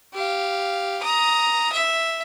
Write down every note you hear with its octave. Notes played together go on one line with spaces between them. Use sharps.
G4 F5
A#5 D#6
E5